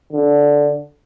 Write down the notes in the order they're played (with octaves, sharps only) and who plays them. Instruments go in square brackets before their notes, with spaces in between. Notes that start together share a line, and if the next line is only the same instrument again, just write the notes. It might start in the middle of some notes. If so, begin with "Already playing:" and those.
[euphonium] D3